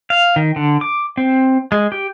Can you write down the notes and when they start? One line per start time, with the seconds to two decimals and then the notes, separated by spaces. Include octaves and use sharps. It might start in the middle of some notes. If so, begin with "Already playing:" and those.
0.10 F5
0.36 D#3
0.56 D3
0.81 D6
1.17 C4
1.72 G#3
1.92 G4